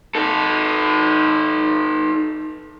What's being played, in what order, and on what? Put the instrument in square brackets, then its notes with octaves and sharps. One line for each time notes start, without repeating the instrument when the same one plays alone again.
[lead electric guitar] D#4 A4